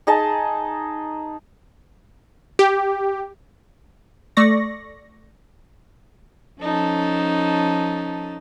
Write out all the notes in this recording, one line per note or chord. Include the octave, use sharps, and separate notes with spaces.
D#4 G#4 D#5 A5
G4
A3 D5 C#6 A#6
F3 C#4 D#4 A4 A5